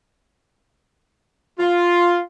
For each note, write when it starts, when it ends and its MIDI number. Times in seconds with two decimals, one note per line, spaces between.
1.59 2.20 65